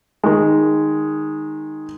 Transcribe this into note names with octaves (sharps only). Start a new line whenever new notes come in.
D#3 G#3